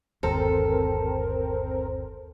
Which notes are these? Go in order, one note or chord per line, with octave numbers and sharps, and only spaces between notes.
G1 D#2 C4 A4 A#4 C5